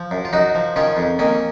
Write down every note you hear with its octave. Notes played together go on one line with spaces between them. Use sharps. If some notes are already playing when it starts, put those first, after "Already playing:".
Already playing: F3
F#2
F4
F#2 D#4 F#4
F3
D#3 C#4 F4
F2
D#3 A#3 C#4